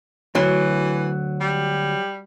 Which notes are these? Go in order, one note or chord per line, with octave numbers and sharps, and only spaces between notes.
D2 E3 F#3
G3